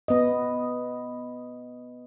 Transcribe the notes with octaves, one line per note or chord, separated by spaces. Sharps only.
B3 D#5